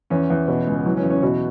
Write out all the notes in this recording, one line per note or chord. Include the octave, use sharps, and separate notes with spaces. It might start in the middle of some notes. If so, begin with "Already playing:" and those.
E2 C#4
E2
B2
C#2
E3 F#3
C#4
E2
C#4
B2 F#4